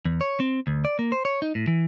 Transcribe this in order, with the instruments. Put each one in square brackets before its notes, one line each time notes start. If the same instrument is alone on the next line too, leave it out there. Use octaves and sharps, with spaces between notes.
[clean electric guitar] E2
C#5
C4
D2
D5
A#3
C5
C#5
D#4
A2
E3